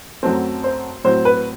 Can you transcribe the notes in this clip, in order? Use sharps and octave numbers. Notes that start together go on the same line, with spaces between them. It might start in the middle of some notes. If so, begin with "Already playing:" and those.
F#2 F#3 A3 C4
C5
A2 F#3 C4 C5
B4